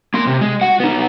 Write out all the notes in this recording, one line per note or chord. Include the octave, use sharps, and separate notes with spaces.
A#3 C6
C3
G#3
F#4 F#5
B3 D#4